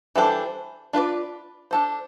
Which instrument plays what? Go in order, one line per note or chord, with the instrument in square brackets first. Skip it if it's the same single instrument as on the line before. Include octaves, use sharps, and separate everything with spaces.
[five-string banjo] E3 G3 D4 A4 C5
D4 F4 B4 D5
D4 A4 C5